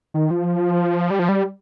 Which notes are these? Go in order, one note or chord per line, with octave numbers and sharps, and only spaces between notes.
D#3
F3
G3
F3
G3